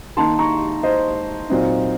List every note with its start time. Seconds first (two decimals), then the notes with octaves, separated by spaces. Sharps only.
0.17 D#3 A#3 D#4 A5 C6
0.39 A#5 C#6
0.83 C5 D#5
1.50 A#2 F#3 C4 D#4